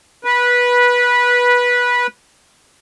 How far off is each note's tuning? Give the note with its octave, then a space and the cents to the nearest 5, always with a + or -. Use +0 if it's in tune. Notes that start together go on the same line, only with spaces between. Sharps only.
B4 -15